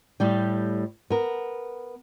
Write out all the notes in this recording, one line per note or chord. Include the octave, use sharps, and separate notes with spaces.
A2 G3 G4
B3 A#4